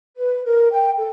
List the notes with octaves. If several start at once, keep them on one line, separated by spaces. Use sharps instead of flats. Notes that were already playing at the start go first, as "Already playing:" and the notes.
B4
A#4
G5
A4